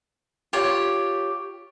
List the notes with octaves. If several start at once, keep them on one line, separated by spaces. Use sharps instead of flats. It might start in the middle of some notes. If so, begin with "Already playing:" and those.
F4 G4 C#5